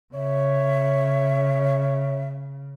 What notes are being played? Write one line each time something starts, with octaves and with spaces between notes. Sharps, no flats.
C#3 C#5 E5